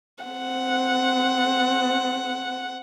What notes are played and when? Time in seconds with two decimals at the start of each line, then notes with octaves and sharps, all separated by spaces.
0.25 C4 F#5